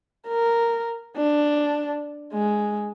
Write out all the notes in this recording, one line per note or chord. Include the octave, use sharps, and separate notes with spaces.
A#4
D4
G#3